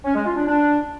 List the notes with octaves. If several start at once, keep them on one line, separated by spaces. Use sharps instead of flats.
C#4
G#3
F4
D4
D4